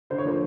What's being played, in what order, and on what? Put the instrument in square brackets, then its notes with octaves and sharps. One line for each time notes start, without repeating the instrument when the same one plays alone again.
[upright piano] D3 [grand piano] C5
[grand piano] C#5
[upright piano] F3 A#3 [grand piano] C5